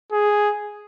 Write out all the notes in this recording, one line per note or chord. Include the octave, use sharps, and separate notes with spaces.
G#4